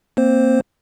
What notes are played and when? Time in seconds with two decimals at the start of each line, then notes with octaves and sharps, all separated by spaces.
0.17 A#3 C4 C5